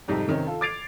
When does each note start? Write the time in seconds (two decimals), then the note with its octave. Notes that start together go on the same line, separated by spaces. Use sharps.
0.08 F2 G#2 C3 G3 D#4 A4
0.28 C3 D#3 C4 C#4
0.47 F4 A4
0.61 D6 G#6 A6 C7 D7 F7